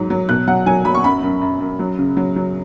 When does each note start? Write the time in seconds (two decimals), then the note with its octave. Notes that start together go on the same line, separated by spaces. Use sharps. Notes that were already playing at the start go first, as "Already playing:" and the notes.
Already playing: G#2 F#3
0.10 F#3
0.29 B2 F#6
0.47 F#3 F#5
0.66 F#3 G#5
0.85 F#3 B5
0.95 C#6
1.04 F#2 B5
1.23 F#2
1.42 F#2
1.60 F#2
1.79 F#3
1.99 C#3
2.17 F#3
2.36 F#3